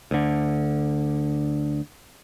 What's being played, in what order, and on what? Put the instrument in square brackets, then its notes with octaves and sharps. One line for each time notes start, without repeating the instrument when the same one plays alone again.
[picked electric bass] D2 D3